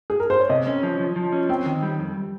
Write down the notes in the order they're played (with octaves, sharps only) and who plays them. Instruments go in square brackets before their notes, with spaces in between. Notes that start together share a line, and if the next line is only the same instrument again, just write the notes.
[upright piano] G#4
A#4
C5
C#5
[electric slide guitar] C3 [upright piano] D#5
[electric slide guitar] C#4
F3
F3
F3
C#4
[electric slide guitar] C4 [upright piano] G5
[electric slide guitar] D#3
G3
F2